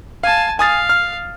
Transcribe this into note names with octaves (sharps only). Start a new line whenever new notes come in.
F5 G#5 A5
F5 G#5 D#6 A6
F6